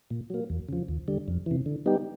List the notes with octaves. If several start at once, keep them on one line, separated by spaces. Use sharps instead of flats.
A#2
F#3 A#3
E2
C#3 F3
D#2
D3 G3
F2
C3 E3
D3
G3 B3 D#4 G4